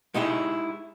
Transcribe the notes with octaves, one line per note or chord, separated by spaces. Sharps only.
G#3 D#4 E4 G4 G#4